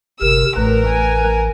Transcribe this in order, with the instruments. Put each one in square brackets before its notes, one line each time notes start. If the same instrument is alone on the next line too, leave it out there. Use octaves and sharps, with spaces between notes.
[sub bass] G1 [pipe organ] C3 A#4 [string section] E6
[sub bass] A1 [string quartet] A2 [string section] A#4 [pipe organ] B4
[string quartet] G#5